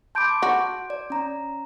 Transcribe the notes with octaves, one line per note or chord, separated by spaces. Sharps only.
A5 B5 C6 D6 G6 D7
F#4
D5
C#4 A#5